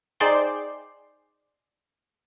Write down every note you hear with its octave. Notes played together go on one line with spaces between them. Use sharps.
D#4 G#4 C5 D5 G5 C6